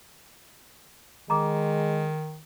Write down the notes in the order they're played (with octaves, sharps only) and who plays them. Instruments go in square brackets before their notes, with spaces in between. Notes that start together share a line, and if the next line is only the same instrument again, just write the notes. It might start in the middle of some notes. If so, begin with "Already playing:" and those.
[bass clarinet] D#3 [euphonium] G#3 [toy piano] A#5 D6